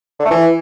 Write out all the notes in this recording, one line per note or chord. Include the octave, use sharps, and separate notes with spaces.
D3
A3
E3